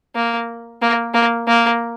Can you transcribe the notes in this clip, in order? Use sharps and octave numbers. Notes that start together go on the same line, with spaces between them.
A#3
A#3
A#3
A#3